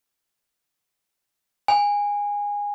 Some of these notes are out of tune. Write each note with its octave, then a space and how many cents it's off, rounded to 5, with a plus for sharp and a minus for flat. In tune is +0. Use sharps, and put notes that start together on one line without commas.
G#5 -20